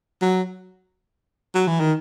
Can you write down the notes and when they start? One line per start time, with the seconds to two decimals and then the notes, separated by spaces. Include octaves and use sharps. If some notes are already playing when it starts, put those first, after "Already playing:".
0.21 F#3
1.55 F#3
1.68 E3
1.80 D#3